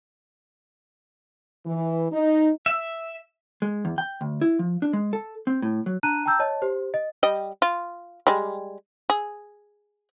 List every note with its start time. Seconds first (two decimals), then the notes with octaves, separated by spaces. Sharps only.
1.65 E3
2.12 D#4
2.66 E5
3.62 G#3
3.85 E2
3.98 G5
4.21 D2
4.41 E4
4.59 F3
4.82 D4
4.93 G#3
5.13 A4
5.47 C4
5.62 A2
5.86 F#3
6.03 D4 A5 A#5 F#6 D#7
6.25 G5 A5 A#5 E6 G6
6.39 C#5 D#5 A5
6.62 G4 C5
6.94 D#5
7.23 G3 D#5 G5
7.62 F4
8.27 G3 G#3
9.10 G#4